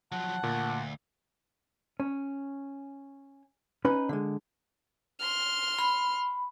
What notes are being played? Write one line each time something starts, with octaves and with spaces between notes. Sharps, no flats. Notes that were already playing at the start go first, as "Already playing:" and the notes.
F3 F#3 F#5 A5
D2 A#2
C#4
C#4 D#4 B4
D3 G#3
C6 F6
B5